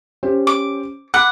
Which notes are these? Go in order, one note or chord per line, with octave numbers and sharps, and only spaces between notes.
C#4 G4 C5
D6
F#5 B5 D6 F#6